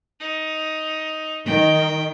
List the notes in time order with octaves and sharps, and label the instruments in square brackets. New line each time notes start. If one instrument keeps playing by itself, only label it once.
[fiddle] D#4
[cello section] D#3 [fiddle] G5